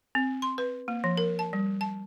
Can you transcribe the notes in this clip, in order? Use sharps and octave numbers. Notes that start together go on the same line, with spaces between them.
C4
C6
B4
A#3
F3
A#4
A5
G3
A5